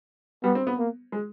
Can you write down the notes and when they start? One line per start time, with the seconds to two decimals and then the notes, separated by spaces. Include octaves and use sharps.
0.44 G3 B3
0.55 C4
0.67 B3
0.78 A#3
1.12 G#3